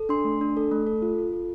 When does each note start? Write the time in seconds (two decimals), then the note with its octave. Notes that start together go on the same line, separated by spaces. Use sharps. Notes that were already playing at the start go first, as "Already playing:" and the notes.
Already playing: A4
0.09 D4 C6
0.24 A3
0.41 D4
0.57 A4
0.71 A3
0.87 A4
1.02 F4
1.18 F4
1.33 A4